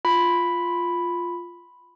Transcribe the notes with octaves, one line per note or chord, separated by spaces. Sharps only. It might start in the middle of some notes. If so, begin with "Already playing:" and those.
F4 B5